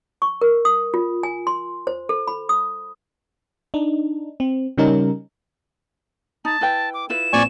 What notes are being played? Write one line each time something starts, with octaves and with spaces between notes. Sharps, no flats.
C#6
A#4
D#6
F4
G#5
C6
C5
A4
B5
D#6
D4 D#4
C4
C#3 G3 C#4 D#4 A#4
D#4 A5
E4 B4 G5
D6
E4 F4 B4 E7
A#1 C4 D5 G#5 C#6